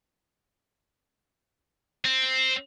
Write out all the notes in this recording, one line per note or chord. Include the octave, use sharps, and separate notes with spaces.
C4